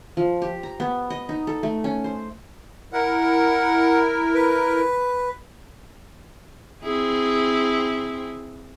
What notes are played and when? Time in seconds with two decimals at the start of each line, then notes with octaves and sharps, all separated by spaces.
0.17 F3
0.42 G4
0.63 A#5
0.80 B3
1.10 D#5
1.29 D#4
1.47 A4
1.63 A3
1.84 C#4
2.04 C5
2.93 E4 A#4 F#5
4.34 B4
6.83 C4 E4 G#4